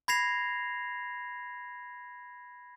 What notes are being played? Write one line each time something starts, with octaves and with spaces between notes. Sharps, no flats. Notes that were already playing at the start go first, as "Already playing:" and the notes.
B5 G#6 A#6 C7 F7